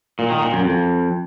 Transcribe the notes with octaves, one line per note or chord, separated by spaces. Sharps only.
A#2
D#3
A#2
F#2
F2